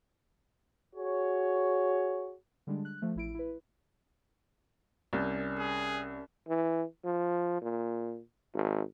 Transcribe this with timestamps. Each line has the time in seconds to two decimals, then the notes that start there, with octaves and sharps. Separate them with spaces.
0.96 F#4 G#4 C#5
2.67 D3 G3 G#3 D4
2.85 F#6
3.02 F3 A3
3.16 A1 E4 D7
3.35 E4 B4
5.13 C2 C#4 A#4 D5
5.59 G#4
6.48 E3
7.04 F3
7.62 A#2
8.54 G#1